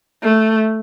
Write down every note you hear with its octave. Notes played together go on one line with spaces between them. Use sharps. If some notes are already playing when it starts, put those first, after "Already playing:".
A3